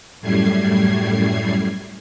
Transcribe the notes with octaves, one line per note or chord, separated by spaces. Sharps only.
F#2 A2 G3 A3 G#6 C7